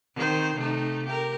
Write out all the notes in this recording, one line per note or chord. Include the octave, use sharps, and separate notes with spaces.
D#3 C4 C5
C3 A3 D#4
G4 A#4